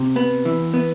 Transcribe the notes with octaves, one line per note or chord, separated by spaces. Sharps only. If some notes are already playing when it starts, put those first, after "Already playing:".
Already playing: C3
B3
E3
B3